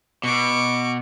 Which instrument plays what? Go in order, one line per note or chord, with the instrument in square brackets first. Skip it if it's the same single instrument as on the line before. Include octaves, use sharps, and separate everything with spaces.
[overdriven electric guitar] B2 [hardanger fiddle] C#6 D6